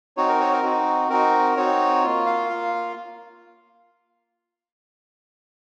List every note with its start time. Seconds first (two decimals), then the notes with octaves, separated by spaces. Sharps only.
0.17 C4 D#4 F#4 C#5
0.28 A#4
0.41 C#5
0.52 A#4
0.63 C4 D#4 F#4
1.09 C4 D#4 F#4 A#4
1.57 C4 D#4 F#4 C#5
2.04 A#3 F4
2.26 F5
2.49 A#3 F4